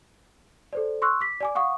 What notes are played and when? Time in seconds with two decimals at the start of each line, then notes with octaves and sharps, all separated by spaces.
0.73 A4 C5 D5
1.02 C6 C#6 E6 F#6
1.21 D6 B6
1.40 D5 G#5 D6
1.55 F5 F#5 C#6 D#6